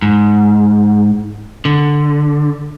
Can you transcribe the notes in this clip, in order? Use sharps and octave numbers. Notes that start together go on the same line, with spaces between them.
G#2
D3